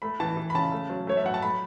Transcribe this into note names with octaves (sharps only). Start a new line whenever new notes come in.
A3 B5
E3 A5
E3
B5
C#3 A5
A3
F#3
A3 C#5
E5
F#3 F#5
A5
A3 B5